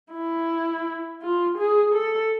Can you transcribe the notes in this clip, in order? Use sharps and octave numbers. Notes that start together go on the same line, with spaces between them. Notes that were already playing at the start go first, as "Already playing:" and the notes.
E4
F4
G#4
A4